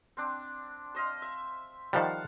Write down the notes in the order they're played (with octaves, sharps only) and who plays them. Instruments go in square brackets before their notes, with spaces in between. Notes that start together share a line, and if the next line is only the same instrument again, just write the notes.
[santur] C4 D4
C5 D#5 F5
E5
[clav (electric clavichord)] D#3 F3 G3 [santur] F5 F#5 A5